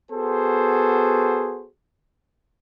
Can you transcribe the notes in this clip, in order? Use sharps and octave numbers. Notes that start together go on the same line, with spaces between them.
B3 F#4 G#4 A4 C5